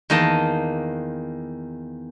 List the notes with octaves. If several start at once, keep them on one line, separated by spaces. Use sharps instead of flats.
E2 D#3 A#3 D#5 A5